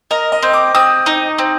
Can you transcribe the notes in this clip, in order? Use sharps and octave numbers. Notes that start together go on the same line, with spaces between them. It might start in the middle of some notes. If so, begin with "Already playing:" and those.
A#4 D#5
D#5
C4
D6
C4 D#6
D#4
C4